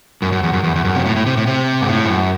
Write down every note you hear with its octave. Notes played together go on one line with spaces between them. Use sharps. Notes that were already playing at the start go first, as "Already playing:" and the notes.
F#2
F#2
E2
F#2
E2
E2
F#2
C3
A2
A2
C3
A2
C3
G#2
A2
G#2
F#2